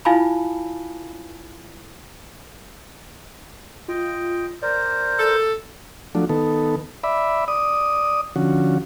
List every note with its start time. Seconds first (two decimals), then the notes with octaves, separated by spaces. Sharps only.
0.05 E4 F4 F5 G#5 A5 B5
3.88 F4 D#5 G5
4.62 A#4 C5 D5
5.19 A4
6.15 F3 F#3 A3 D4
6.29 D#3 B3 A4
7.04 D5 E5 B5
7.48 D5 D#6
8.36 D3 F3 C#4 F#4